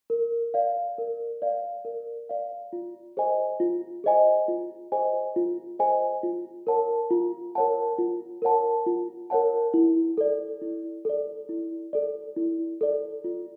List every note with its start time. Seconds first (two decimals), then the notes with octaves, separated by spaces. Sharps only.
0.10 A#4
0.54 D5 F5
0.98 A#4
1.42 D5 F5
1.85 A#4
2.29 D5 F5
2.73 F4
3.17 G#4 C5 D#5 G#5
3.60 F4
4.04 G#4 C5 D#5 G#5
4.48 F4
4.92 G#4 C5 D#5 G#5
5.36 F4
5.79 G#4 C5 D#5 G#5
6.23 F4
6.67 A#4 C#5 F#5 A5
7.11 F4
7.55 A#4 C#5 F#5 A5
7.99 F4
8.42 A#4 C#5 F#5 A5
8.86 F4
9.30 A#4 C#5 F#5 A5
9.74 E4
10.18 A4 D5
10.61 E4
11.05 A4 D5
11.49 E4
11.93 A4 D5
12.36 E4
12.81 A4 D5
13.24 F4